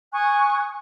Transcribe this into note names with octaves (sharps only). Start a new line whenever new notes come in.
G#5 C#6 D#6 F#6